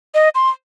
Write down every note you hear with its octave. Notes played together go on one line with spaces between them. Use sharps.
D#5
C6